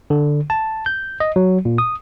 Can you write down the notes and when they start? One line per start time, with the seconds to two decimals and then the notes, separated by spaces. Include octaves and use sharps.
0.10 D3
0.50 A5
0.86 G6
1.20 D#5
1.36 F#3
1.65 A#2
1.78 D#6